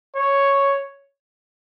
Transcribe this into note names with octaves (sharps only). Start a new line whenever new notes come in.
C#5